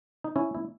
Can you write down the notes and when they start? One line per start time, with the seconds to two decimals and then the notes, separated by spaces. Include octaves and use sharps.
0.24 D#4
0.36 C#4 E4
0.55 E4